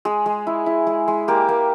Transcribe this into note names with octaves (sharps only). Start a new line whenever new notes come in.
G#3 G#4
G#3
E4
E4
G#3
G#3
A#3 G4
A#3